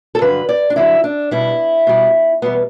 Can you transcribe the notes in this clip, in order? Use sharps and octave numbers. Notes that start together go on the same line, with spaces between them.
A4
G2 D3 F#3 B4
D5
D4
G2 D3 F#3 E4
D4
B2 G3 E4
B2 G3
E2 B2 G3 B3